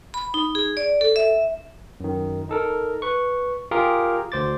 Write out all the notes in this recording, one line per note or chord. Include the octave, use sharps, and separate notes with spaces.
B5
D#4
G#4
D5
A4
E5
F#2 D#3
D#4 A4 A#4
B4 C#6
F4 G4 G#4 A#4 F5
D2 C5 D6 A6